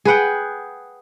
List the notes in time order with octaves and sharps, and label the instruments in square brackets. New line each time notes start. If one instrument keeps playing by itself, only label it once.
[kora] G#4 B4 F#5 G5